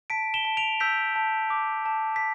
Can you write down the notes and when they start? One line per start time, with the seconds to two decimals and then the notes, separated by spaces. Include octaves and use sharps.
0.10 A5 B6 D7
0.34 E7 G7
0.45 A5
0.57 D7 F7
0.80 E6 G6 B6
1.16 A5
1.50 D6
1.85 A5
2.16 B6